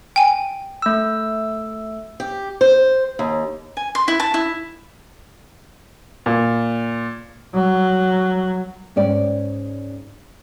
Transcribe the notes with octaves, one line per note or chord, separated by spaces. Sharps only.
G5 G#5
A3 E6
G4
C5
D#2
G#5
C6
E4
A5
E4
A#2
F#3
G#2 C#4 D5 G5